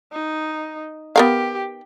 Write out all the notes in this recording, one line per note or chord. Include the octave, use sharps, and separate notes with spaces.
D#4
B3 G4 A#4 F5